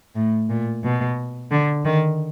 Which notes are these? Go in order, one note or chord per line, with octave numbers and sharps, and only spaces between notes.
A2
A#2
B2
D3
D#3